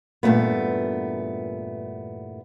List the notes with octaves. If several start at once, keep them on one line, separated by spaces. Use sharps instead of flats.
E2 G2 A#2 A3 B3